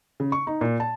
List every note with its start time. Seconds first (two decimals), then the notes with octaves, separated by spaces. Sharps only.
0.20 C#3
0.32 C#6
0.47 D#4
0.61 A#2
0.80 A5